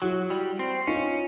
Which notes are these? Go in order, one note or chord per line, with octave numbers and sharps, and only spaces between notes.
F#3 E4 F#4
G3
C4
C#4 D#4 F4